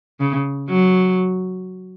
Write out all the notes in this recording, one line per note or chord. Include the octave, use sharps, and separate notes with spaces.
C#3
F#3